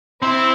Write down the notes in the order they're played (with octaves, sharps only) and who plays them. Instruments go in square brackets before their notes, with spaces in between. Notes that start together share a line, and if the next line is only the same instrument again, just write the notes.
[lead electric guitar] C4 [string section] E4